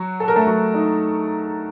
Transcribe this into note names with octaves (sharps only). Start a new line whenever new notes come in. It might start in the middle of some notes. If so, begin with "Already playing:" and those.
Already playing: F#3 F#4
A4
A#4
A3 A4
F#3 F#4
D#4